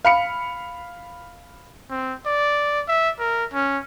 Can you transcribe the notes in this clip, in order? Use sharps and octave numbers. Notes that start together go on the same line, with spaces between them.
F5 B5 C#7
C4
D5
E5
A#4
C#4